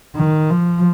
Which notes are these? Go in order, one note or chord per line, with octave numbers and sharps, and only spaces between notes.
D#3
F3